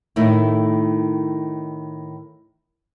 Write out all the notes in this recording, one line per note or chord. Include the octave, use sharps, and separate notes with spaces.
A2 D#3 A3 D#4 E4